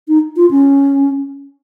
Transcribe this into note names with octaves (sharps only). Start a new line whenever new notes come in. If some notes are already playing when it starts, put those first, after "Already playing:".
D#4
F4
C#4